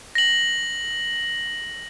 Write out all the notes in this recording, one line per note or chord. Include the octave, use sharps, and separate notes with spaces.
A#6 F#7